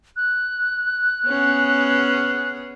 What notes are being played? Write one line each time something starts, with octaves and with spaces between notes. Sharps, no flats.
F#6
B3 C#4 G#4